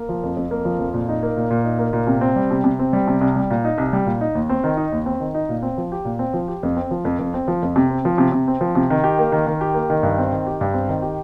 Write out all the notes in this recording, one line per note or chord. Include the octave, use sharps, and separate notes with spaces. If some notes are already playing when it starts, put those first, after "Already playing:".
Already playing: A#3
F3
F2
F2
A#3
F3
F2
A#2
D#4
A#3
A#2
A#2
D#4
A#3
A#2
C3
C4
G3
C3
C3
C4
G3
C3
C2
G3
A#2
D#4
C2
G3
A#2
D#4
D#2
C4
D#3
D#4
D#2
C4
D#3
D#4
A#2
C4
F3
G4
A#2
C4
F3
G4
F2
C4
F3
F2
F2
C4
F3
F2
C3
C4
F3
C3
C3
C4
F3
C3
D#3
G4
A#3
D#3
D#3
G4
A#3
D#3
G2
C4
D#3
G4
G2
C4
D#3
G4